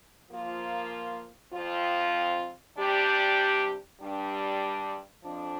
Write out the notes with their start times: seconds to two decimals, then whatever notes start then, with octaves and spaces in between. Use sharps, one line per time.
0.29 F3 A#3 F4
1.53 F2 F3 C4 F4
2.76 C3 G3 D4 G4
4.01 G2 G3 D4
5.24 F2 F3 D4